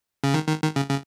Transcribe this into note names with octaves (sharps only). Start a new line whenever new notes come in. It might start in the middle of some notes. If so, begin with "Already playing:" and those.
C#3
D#3
D#3
D#3
C#3
C#3